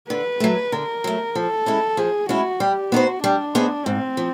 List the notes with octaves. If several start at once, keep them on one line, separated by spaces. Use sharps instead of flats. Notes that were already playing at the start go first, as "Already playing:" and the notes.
D3 B4
F#3 A3
D3 A#4
F#3 A3
F3 A4
G#3 C#4 E4
F3 G#4
G#3 C#4 E4 F#4
G3 G4
B3 D#4 F#4 G#4 C5
G3 D4
B3 D#4 G#4 C5
G#2 C4
F3